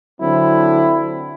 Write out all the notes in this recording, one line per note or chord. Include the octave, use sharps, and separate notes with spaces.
D3 F#3 C4 E4